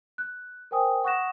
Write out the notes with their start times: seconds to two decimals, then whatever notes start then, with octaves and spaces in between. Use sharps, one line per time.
0.18 F#6
0.71 A#4 C5 G5 G#5 D#6
1.04 F#5 C#6 D#6 F#6 A#6 E7